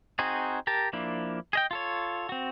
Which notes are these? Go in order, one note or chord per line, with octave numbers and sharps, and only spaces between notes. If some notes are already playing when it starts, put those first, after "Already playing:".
C4 D#4 F#4 G#4
G4 A#4 A5
F3 A#3 D4 E4
G#4 D#5 G5
F4 A4 C#5
C4 F#4